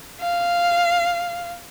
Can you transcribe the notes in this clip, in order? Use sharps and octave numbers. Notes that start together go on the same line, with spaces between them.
F5